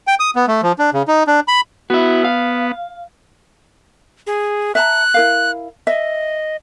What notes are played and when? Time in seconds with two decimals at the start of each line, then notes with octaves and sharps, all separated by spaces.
0.07 G5
0.20 D#6
0.36 B3
0.48 A3
0.63 F3
0.79 D4
0.94 C#3
1.08 D#4
1.27 D4
1.48 B5
1.90 B3 E4 F#4
2.25 F5
4.27 G#4
4.75 E5 A5 A#5 F#6
5.14 E4 A#4 F5
5.87 D#5 E5